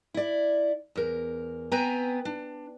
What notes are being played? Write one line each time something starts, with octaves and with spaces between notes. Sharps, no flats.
E4 D5
E2 A#4
B3 C4 B4 G5 G#5 A#5
D4